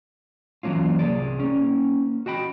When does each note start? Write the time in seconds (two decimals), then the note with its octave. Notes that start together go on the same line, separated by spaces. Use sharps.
0.63 E3 F#3 A#3 C#4 F4
0.99 C2 G#4 D5
1.40 A#3 C#4
2.26 F#4 D#5 G5 B5